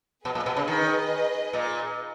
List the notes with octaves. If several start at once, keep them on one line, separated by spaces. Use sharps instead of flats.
B2 G#4 B4 D#5
A#2
B2
C#3
D#3
A#2